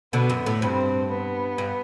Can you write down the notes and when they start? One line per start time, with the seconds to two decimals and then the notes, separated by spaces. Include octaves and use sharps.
0.13 B2 D3 B3
0.30 F#2
0.46 A2
0.62 G2 C4
1.11 B3
1.58 G2